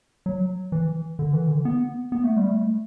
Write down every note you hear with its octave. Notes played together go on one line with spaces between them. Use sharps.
F#3
E3
D3
E3
D3
B3
B3
A3
G3
A3